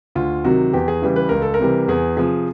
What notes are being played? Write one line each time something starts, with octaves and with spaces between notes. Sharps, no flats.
D2 F4
C3 D#3 F#3 F#4
E2 G4
G#4
C#3 E3 G3
B4
C#2 A#4
A4
A#4
C3 E3 G3
E2 G#4
C3 F3 G#4